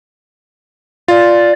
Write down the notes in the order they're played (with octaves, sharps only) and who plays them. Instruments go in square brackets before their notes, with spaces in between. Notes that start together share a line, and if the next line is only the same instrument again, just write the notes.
[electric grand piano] F4 [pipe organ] D5